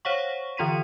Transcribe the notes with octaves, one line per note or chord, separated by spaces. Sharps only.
C5 C#5 F5 F#5 C#6
D3 E3 F4 C6 B6 D#7